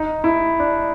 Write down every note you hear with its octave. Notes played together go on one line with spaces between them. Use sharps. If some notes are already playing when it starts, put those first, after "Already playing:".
Already playing: D#4
E4
D4